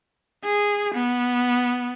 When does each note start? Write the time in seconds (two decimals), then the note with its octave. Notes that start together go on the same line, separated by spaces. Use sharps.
0.44 G#4
0.94 B3